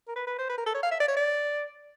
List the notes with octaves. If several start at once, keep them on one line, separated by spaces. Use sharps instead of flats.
A#4
B4
B4
C5
B4
A#4
A4
C#5
F5
E5
D5
C#5
D5